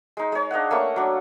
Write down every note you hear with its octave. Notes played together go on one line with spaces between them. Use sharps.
G#3 D#4
G#3 C#5
D4 D#5 F5 F#5
A3 A#3 C#4 C#6
F#3 D4